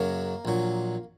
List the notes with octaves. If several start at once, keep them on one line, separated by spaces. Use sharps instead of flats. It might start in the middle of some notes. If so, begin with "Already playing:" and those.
Already playing: F#2 C#3 F#3 A#3 A#4
A#1 A#2 F#3